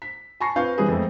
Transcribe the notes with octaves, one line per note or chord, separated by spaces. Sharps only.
B6
G#5 A5 B5 C#6 A#6 C7
C4 F4 B4 F5 C#6 G6
E3 G3 B3 C4 G#4 B4
F2 G#3 A3